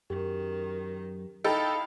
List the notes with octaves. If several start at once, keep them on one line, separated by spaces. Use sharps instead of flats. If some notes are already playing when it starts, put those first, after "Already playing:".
F#2 D#3 G4
D#4 E4 A4 D#5 F5 G5 B5